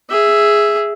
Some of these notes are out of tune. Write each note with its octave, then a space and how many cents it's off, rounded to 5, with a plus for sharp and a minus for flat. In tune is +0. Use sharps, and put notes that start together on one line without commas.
G#4 +0 E5 +5